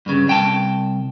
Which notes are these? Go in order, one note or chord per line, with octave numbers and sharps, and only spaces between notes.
G2 C#3
C2 G5 A5